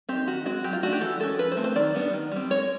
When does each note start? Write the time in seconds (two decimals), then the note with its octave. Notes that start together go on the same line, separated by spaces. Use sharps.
0.09 C4 D#4 G4
0.27 D#3 F#4
0.45 G#3 C4 F#4
0.64 F#3 G4
0.73 F4
0.83 A3 D4 F#4
0.92 G4
1.01 E3 A4
1.20 G#3 C#4 A4
1.38 F3 B4
1.52 C5
1.57 A3 C4
1.64 C5
1.76 D#3 D5
1.95 G3 B3 D4
2.14 D#3
2.32 G3 C4
2.50 G#3 C#5